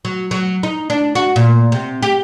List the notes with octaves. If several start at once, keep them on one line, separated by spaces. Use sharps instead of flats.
F#3
F#3
D#4
D4
F#4
A#2
C3
G4